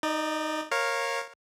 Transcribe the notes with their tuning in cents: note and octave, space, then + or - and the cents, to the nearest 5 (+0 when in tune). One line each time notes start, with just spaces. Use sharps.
D#4 +0 D5 +35
A#4 +0 C#5 -20 F5 +0